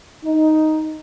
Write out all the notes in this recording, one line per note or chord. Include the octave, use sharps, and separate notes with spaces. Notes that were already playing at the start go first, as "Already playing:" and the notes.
D#4